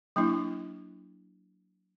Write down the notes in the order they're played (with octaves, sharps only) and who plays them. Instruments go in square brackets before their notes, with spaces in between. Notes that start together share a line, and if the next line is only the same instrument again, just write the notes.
[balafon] F#3 A#3 D4 E4